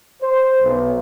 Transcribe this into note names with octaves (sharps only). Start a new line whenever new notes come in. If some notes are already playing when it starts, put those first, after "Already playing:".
C5
B1